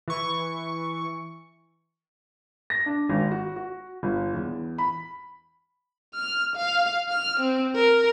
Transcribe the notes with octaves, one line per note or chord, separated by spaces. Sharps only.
E3 C#6
A#6
D4
G#1
F#4
F#4
G1
E2
B5
F6
F5
F6
C4
A#4